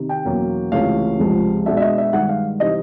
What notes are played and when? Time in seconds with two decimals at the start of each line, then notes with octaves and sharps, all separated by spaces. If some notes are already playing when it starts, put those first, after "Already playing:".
Already playing: C3 D#3
0.09 G5
0.25 E2 B2 F#3 A#3 C#4
0.72 C#2 C3 E3 A3 C#4 F5
1.19 C#2 C3 F3 G#3
1.66 B2 G#3 B3 D4 E5
1.77 E5
1.82 D#5
1.98 E5
2.13 G2 D#3 G#3 F#5
2.29 F5
2.60 C3 E3 G3 C4 D#4 D#5